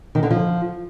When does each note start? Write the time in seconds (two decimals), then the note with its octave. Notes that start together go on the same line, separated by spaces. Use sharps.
0.15 D#3
0.23 D3
0.30 F3